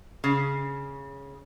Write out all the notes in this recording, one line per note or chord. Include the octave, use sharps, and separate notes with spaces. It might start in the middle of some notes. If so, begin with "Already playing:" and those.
C#3